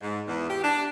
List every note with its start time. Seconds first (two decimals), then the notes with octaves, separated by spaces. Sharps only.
0.02 G#2
0.28 E2
0.50 G4
0.64 D4